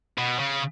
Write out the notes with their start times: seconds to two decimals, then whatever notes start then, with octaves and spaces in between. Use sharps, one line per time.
0.18 B2
0.39 C#3